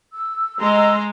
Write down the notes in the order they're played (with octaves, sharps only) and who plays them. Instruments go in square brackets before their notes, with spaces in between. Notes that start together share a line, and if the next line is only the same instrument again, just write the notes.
[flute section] E6
[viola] G#3 [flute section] D#5 E6 [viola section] A#5 C6